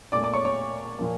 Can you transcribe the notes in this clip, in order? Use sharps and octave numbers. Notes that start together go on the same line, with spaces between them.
A#2 D5 D6
A3
D5 D6
C#5 C#6
C#5 C#6
A#2 F3 A#3